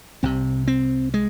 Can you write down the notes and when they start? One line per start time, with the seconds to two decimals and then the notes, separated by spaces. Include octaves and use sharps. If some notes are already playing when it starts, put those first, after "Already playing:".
0.23 C2 C3 C4
0.68 C4
1.14 G#3